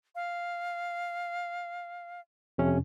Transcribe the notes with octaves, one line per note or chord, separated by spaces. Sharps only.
F5
F2 C3 C#4